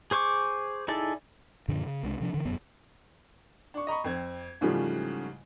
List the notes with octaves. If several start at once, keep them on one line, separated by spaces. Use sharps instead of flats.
G#4 C5 C#6 D6
D#4 E4 G#4 A4 D5
F#2 A#2 D3 F3
C#3
C2 G#3 D4
C3 F3 D4
D3 E3
E1 F#2 B3
D4 C#6
D#5 A#5 B5 C#6
F2 C4 G#6
G#2 C#3 E3 F3 G3 A3